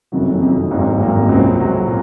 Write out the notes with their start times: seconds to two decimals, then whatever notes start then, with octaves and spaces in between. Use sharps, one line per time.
0.12 F#1 F2 C3 D#3 F#3
0.41 F#1 F2 C3 D#3 F#3
0.71 G#1 G#2 F#3 A#3
0.99 G#1 G#2 F#3 A#3
1.29 C#2 C3 F#3 C4
1.57 C#2 C3 F#3 C4
1.87 A#2